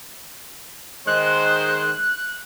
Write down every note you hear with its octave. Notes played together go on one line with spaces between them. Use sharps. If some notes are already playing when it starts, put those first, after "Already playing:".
D#3 G#3 C5 F#6